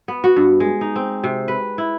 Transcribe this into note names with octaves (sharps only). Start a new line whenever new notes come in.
B3
F#4
G2
G#3
D#4
C4
C3
B4
E4